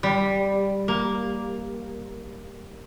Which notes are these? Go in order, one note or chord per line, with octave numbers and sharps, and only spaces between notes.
G3
A#3